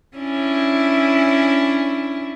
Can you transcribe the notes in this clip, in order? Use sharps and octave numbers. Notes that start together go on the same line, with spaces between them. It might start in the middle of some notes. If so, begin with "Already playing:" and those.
C#4 D4 E4